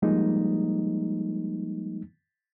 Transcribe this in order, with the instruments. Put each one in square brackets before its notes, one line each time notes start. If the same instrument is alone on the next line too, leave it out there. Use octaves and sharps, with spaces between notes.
[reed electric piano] F3 G3 G#3 A#3 D#4